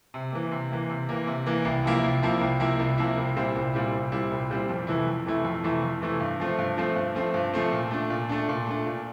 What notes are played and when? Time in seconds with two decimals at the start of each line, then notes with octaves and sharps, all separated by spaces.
0.14 C3
0.32 E3 A#3
0.51 C3
0.71 E3 A#3
0.90 C3
1.09 E3 A#3
1.27 C3
1.46 E3 A#3
1.65 C2
1.84 C3 F3 A#3 E4
2.04 C2
2.22 C3 F3 A#3 E4
2.41 C2
2.60 C3 F3 A#3 E4
2.79 C2
2.98 C3 F3 A#3 E4
3.17 C2
3.36 A#2 G3 C4 E4
3.56 C2
3.74 A#2 G3 C4 E4
3.93 C2
4.12 A#2 G3 C4 E4
4.31 C2
4.50 A#2 G3 C4 E4
4.69 F2
4.87 C3 E3 A3 E4
5.07 F2
5.26 C3 E3 A3 E4
5.45 F2
5.63 C3 E3 A3 E4
5.82 F2
6.01 C3 E3 A3 E4
6.20 G2
6.40 F3 A3 C4
6.59 G2
6.77 F3 A3 C4
6.96 G2
7.15 F3 A3 C4
7.34 G2
7.53 F3 A3 C4
7.72 A#2
7.91 A3 D4
8.10 A#2
8.29 A3 D4
8.49 A#2
8.67 A3 D4
8.86 A#2